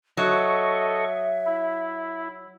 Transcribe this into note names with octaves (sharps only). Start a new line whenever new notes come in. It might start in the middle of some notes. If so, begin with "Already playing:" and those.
F#3 A4 D#5 E5 C#6
E4